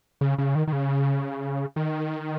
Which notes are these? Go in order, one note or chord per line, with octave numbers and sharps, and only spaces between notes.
C#3
C#3
D#3
D#3
C#3
D#3